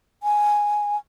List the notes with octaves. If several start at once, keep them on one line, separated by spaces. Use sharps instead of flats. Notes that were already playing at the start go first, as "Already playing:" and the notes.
G#5